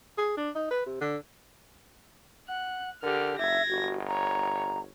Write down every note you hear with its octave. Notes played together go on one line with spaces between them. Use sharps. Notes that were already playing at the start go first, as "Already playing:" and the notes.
G#4
D4
D#4
B4
C3
D3
F#5 F#6
D3 G4 A#4 F6
F#1 E5 G#6 A#6
G1 F#4
C#5 A#5